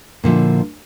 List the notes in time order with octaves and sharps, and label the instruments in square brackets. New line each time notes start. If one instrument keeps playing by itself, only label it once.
[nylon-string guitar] A#2 D3 F3 E4